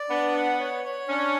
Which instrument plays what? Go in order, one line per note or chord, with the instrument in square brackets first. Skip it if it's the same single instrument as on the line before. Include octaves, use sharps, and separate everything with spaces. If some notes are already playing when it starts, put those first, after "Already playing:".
Already playing: [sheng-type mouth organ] D5
[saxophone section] B3 [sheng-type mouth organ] D4
[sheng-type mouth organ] F#5
C#5
C#5
[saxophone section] C#4 [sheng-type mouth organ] D4